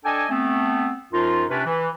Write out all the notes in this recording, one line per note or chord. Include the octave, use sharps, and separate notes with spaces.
D4 A4 D#5 G5 G#5
A3 B3 C4
F#2 F3 D#4 F4
C3 C#4 D4 B4
E3